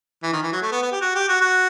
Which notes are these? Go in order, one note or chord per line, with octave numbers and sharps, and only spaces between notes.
E3
D#3
E3
F#3
A3
B3
B3
G4
F#4
G4
F#4
F#4